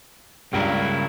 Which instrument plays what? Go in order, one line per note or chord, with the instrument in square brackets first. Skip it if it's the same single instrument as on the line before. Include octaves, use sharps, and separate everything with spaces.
[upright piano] C#2 G2 [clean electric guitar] C#3 A#3 E4